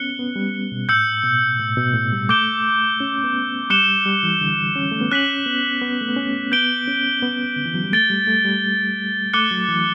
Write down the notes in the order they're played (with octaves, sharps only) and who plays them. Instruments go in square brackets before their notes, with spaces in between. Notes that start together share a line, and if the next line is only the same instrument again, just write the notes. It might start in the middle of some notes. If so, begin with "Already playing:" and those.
Already playing: [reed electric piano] B3 C#4 [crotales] F#6 C#7 G7
[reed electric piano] B3
G3
B2
[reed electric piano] A2 [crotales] E6 G6 C#7
[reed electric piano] B2
A2
B2
A2
G3
[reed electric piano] A3 [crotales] D6 G6 D7 G7
[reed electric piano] C#4
B3
[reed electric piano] G3 [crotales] D6 F#6 C#7 E7 G7
[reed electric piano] G3
E3
D3
C#4
A3
B3
[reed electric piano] C#4 [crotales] F#6 B6 F#7
[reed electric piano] B3
B3
A3
B3
C#4
[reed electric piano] B3 [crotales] G6 D7 G7
[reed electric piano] C#4
B3
D3
E3
F#3
G3
[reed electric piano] A3 [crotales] A6 D7 G7
[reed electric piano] G3
A3
G3
[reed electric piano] A3 [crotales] D6 F#6 C#7 G7
[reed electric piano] F#3
E3